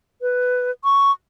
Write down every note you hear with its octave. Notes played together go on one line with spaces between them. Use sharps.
B4
C#6